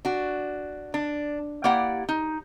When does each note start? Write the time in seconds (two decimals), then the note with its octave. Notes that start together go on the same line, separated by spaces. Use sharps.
0.05 D4 F#4
0.94 D4
1.64 A#3 E4 G4 D5 F#5
2.09 D#4